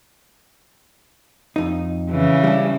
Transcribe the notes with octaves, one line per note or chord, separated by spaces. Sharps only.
F2 D#4
C#3 E3
G3 D4